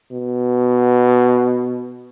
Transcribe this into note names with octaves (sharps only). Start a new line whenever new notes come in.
B2